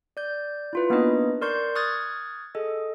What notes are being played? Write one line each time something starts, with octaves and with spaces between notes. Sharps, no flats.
D5 G6
E4 F4 B4
A#3 B3 D4 D#4 B4 D#5
A#4 D5 C6 C#6 G6
C#6 D#6 F6 F#6 G#6 A6
G#4 A4 D#5